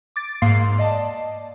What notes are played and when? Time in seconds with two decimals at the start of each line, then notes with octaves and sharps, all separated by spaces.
0.16 D6 A6 D7
0.42 G#2 A#3 F5 C6 C7
0.78 D5 D#5 A5